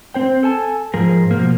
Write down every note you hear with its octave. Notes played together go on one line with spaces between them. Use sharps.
C4 C5 G5
A4 G#5 A5
G#2 F3 G#4 A#4
B2 F3 A#3